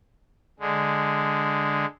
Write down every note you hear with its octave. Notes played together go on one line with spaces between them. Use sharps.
D3 G#3